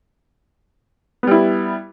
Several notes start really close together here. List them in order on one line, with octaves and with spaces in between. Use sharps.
B3 G3 E4